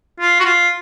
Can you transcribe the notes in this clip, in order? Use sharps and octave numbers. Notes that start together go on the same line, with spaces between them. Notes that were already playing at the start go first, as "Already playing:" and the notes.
F4
F#4
F4